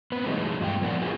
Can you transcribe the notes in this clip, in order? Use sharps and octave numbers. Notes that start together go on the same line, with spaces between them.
B3 C4 B4
E3 F#3 G#3 A3 D#4
G2 F4 G5
F3 B3 A#4 D5 F#5
F4 F#4 G#4 A#4